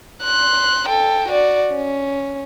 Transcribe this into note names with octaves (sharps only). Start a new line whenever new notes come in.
C6 F#6
A4 G5
F#4 D5
C#4